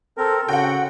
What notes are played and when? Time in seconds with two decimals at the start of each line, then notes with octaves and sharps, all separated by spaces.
0.17 C4 A4 A#4
0.49 C#3 F#4 F#5 G5